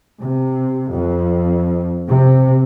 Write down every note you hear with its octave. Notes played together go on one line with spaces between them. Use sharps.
C3
F2
C3